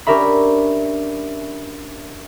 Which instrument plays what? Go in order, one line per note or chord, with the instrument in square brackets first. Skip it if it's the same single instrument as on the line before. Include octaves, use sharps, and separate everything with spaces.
[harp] C#4 D4 G4 A#4 E5 B5